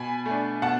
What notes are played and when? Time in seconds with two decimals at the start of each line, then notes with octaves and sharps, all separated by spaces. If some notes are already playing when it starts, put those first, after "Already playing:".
Already playing: B2 G#5 B5
0.26 A3
0.31 D4
0.62 B2 F#5 A5